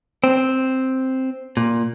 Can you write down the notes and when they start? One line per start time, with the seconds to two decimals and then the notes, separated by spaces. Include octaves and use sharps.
0.24 C4
1.57 A#2